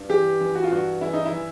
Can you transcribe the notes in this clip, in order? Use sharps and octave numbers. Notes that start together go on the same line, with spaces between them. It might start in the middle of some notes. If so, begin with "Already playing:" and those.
Already playing: G2
E3 G4
E3
F#4
F4
G2 F#4
E3 E4
D#4
E4
E3